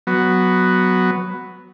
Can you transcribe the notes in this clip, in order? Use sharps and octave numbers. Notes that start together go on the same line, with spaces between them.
F#3 B3